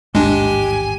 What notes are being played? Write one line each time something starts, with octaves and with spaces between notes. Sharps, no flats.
A1 D#2 G#2 G#3 D4 G4 G#5